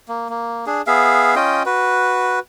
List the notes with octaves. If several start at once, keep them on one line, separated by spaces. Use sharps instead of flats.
A#3
A#3
D4 G#4
B3 G#4 E5 F5
C#4 F4 D#5 G5
F#4 B4